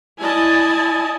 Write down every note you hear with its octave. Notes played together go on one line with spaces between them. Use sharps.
E4 D5 D#5 G#5 A5